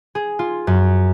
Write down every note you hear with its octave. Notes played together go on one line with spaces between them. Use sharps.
G#4
F4
F#2